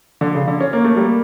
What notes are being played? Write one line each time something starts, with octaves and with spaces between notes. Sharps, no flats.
D3
C#3
D3
C#4
A#3
A3
G3 A#3